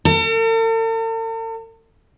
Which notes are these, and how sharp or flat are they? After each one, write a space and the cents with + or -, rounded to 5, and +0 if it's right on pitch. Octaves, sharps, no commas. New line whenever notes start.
A4 +45